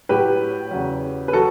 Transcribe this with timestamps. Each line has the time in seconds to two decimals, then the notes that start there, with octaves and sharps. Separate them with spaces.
0.09 A2 F#3 G4 B4
0.71 E2 C#3 F#3
1.28 B4
1.33 F#3 F#4 A4